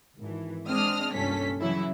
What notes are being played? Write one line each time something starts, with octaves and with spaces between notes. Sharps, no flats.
G#1 E3
G#3 C4 D4 D#6 F6
C2 G2 A#2 C#4 A4 B6
C#3 E3 F#3 E4